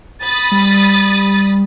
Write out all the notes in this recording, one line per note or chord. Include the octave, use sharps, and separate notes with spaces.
B5 D#6 A6
G3